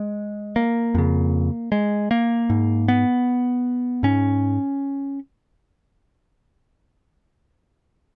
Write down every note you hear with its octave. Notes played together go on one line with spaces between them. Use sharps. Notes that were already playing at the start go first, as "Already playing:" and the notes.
Already playing: G#3
A#3
F2 C#3
G#3
A#3
G#2
B3
G#2 C#4